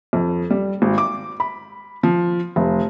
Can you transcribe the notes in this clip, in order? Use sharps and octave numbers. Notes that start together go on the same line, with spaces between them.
F2
G3
G#1
D6
B5
F3
F1